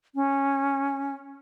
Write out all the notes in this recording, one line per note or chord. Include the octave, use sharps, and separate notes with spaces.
C#4